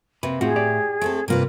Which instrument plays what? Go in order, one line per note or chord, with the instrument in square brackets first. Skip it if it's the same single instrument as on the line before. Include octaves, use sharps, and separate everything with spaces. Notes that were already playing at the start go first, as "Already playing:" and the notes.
[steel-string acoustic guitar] C3 A#3 [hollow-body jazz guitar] B4
[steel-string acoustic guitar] A2 [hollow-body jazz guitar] C4 F4 F#4 [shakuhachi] G#4
[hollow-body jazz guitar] G4 D5
[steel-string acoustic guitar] A3 C4 A4
[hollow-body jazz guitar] G2 C3 [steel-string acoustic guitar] A#3 F4 B4 [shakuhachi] A#4